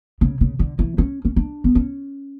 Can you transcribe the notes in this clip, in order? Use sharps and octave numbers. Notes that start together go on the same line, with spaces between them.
C#3
C#3
D3
E3
C#4
C#4
D4
B3
C#4